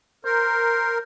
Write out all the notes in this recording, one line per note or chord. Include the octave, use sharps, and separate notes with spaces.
A#4 C5